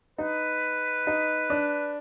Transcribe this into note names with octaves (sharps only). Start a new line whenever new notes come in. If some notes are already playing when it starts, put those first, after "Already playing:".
D#4 B4
D#4
D4